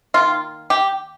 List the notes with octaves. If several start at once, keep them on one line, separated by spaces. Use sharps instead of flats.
D#3 A#3 F4
G4